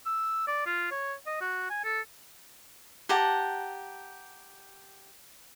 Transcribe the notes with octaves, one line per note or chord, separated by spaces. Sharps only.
E6
D5
F4
C#5
D#5
F#4
G#5
A4
G4 F#5 A5 A#5